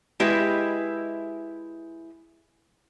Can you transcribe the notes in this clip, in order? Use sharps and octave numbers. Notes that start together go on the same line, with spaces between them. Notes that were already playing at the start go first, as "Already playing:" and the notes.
G#3 E4 G4 B4 D#5 E5